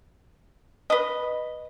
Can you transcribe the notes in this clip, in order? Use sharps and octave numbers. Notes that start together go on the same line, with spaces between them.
B4 D#5